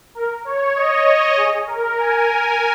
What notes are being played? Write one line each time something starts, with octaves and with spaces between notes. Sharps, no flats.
A#4
C#5
D#5
C#5
G#4
A#4
G#5